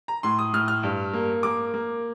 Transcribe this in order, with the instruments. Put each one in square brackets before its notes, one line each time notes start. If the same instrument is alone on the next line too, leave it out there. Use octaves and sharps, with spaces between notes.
[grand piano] A#5
A2 C6
D#6
A2 F6
F6
G2
A#3
A#3 D6
A#3